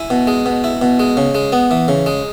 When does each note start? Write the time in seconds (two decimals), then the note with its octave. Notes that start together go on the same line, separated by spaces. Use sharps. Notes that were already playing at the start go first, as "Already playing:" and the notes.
Already playing: E4 G#5
0.10 B2
0.27 G#3
0.46 B2
0.64 E4
0.82 B2
0.99 G#3
1.17 C#3
1.35 G#3
1.52 B3
1.71 E3
1.88 C#3
2.06 G#3